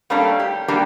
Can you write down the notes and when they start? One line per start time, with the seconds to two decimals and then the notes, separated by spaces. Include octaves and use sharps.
0.10 G3 A3 A#3 C#4 D4
0.39 G4
0.68 G3 A#3 D4 G4